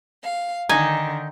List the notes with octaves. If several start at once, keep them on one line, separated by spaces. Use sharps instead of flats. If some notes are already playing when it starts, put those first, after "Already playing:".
F5
D3 D#3 D#4 G#5